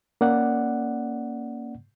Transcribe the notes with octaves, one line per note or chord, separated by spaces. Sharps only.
A#3 C#4 D5 F#5